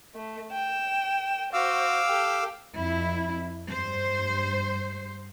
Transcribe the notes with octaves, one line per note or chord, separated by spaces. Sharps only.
A3
G5 E7
F#4 C5 F5 D6 E6
G4 A4
F2 E4
G2 C5